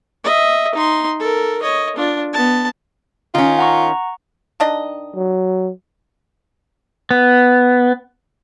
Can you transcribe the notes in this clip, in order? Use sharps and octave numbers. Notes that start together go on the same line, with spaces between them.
D#5 E5
D#4 C6
A4 A#4
C#5 D#5
D4 F4
B3 A5
D#3 C#4 F4
F#5 A#5 C#6
D#3 D4 D#5
F#3
B3